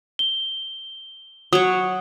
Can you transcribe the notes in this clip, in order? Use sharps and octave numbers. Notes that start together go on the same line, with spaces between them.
G7
F#3 C#5 D#6